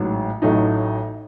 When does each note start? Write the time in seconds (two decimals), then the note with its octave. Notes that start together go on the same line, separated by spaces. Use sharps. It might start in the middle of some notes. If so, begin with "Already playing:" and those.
Already playing: A1 G#2 F#3
0.42 A1 A2 F#3 A3 D#4